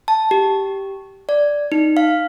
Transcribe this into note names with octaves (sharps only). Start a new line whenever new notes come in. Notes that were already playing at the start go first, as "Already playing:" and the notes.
A5
G4
D5
D#4
F5